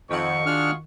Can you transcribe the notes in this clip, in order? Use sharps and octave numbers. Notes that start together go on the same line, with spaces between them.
F2 D#3 F#5 C#6
D4 F4 F#4 G#4 F6